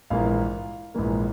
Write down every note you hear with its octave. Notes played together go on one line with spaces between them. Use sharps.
A#1 G#2 E3 A#3 F5
A#1 G#2 E3 A#3